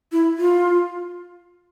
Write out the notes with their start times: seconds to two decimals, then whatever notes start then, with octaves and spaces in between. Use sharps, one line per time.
0.12 E4
0.38 F4